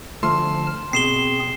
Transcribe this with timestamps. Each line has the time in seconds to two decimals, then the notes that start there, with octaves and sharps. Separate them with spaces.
0.23 D2 F3 A3 A5 C6 F6
0.93 B2 C4 G#4 C7 E7 G7